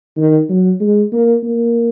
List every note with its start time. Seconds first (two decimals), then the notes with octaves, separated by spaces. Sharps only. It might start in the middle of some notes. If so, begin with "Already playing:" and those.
0.17 D#3
0.49 F#3
0.80 G#3
1.12 A#3
1.43 A#3